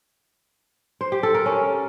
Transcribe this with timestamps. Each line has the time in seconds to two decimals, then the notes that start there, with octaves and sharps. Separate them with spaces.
1.01 C5
1.12 G4
1.23 A4
1.34 A#4
1.46 C#4